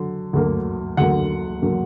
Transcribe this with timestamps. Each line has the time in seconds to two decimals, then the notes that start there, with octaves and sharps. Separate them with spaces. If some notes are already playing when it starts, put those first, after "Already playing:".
Already playing: D3 F#3
0.33 D2 D3 F#3 A#3
0.97 D2 D3 F#3 A#3 F#5
1.62 D3 F#3 A#3